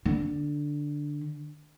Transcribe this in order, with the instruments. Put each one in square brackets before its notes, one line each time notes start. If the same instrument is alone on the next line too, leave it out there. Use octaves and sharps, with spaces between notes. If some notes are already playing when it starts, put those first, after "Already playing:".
[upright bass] D3